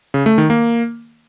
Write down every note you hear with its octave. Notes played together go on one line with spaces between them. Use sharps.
C#3
A3
D#3
A#3